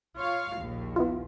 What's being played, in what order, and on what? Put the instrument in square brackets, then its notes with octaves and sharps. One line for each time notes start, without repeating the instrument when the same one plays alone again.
[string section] F4 C#5 F5
A#1 D#2
[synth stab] B3 E4 F4